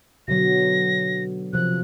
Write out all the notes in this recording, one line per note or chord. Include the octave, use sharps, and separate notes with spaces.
B2 D3 F#3 A#6
C3 F3 F#6